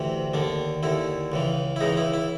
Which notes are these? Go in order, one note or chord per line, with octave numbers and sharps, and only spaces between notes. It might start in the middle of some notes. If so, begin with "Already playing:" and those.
Already playing: D2 C3 E3
D#2 D3 D4
D#2 D3 E4
C#2 C#3 E3
E4
C#2 C#3 E3 D#4
E4
E4